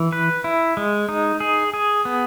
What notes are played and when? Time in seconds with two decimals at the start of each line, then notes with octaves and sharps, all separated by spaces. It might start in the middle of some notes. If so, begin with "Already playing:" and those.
Already playing: E3
0.12 B4
0.44 E4
0.77 G#3
1.09 D#4
1.40 G#4
1.74 G#4
2.05 B3